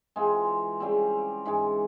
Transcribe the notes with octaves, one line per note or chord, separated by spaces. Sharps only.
E3 G#3 C4 F4
C#3 G3 C4
G#2 E3 G#3